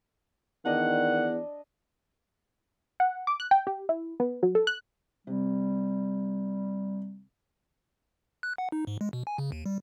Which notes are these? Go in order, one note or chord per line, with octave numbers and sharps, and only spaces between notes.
E2 D#3 D4 D#5 F#5
F#5
D6
F#6
G5
G4
E4
B3
F#3
A4
F#6
C3 G3
F#6
F#5
D#4
G#2
G#3
B2
G#5
C#3
D#2
G3